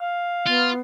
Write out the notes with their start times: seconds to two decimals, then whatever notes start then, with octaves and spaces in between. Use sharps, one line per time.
0.01 F5
0.47 B3 F4